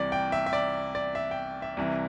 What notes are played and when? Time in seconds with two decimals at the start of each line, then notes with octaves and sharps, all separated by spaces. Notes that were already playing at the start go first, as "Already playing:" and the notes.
Already playing: C2 C3 E3 D5
0.12 G5
0.32 E5
0.46 E5
0.53 D5
0.95 D5
1.15 E5
1.31 G5
1.62 E5
1.77 C2 C3 E3